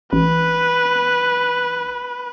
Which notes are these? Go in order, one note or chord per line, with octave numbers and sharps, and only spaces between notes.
A1 B4